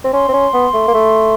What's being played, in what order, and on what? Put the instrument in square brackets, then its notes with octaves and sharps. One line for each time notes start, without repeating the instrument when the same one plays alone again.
[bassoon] C4
[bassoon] C#4 [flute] C6
[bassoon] C4
C#4
B3
A3
A#3
A3